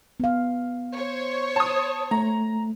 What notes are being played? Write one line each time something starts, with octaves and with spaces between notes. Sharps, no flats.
B3 F5
C5 C#5
A5 D#6
A3 A#5